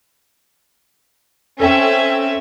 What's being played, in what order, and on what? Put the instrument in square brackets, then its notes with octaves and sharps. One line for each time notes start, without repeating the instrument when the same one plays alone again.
[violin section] C4 C#4 E5 [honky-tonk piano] A4 G5